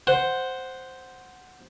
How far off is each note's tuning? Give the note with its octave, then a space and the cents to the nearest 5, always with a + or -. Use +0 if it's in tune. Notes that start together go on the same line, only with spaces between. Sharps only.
C5 +0 F#5 +0